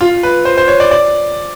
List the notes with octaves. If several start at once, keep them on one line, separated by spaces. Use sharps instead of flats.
F4
B4
C5
C5
C#5
D5
D5